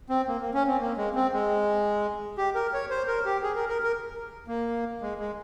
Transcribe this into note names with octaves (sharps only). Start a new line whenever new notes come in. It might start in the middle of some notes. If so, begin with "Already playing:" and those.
C4
A#3
A#3
C#4
C4
A#3
G#3
C4
G#3
G4
A#4
C#5
C5
A#4
G4
G#4
A#4
A#4
A#4
A#3
G#3
G#3